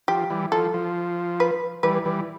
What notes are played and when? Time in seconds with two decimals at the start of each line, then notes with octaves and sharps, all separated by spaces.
0.08 F3 G4
0.30 E3 G3
0.52 F3 A4
0.74 F3
1.40 B4
1.83 E3 G3 B4
2.05 E3 G3